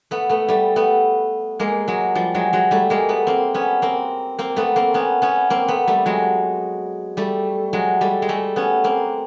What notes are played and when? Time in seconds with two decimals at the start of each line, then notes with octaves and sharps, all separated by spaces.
0.11 A3 B3
0.29 A3 B3
0.49 G3 A3
0.76 A3 B3
1.59 G#3 A#3
1.88 F#3 G#3
2.15 F3 G3
2.35 F#3 G#3
2.53 F#3 G#3
2.71 G3 A3
2.90 G#3 A#3
3.09 A3 B3
3.27 A#3 C4
3.54 B3 C#4
3.82 A#3 C4
4.39 A#3 C4
4.56 A3 B3
4.76 A#3 C4
4.94 B3 C#4
5.22 B3 C#4
5.50 A#3 C4
5.68 A3 B3
5.87 G3 A3
6.06 F#3 G#3
7.17 G3 A3
7.73 F#3 G#3
8.01 G3 A3
8.22 G#3
8.29 G3 A3
8.56 B3 C#4
8.84 A#3 C4